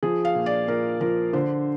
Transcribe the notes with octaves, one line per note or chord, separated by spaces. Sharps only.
F3 G#4
F5
A#2
D5
A#2 A#4
F3 A#4
D3 C5